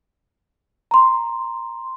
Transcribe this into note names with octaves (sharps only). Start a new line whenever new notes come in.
A#5 C6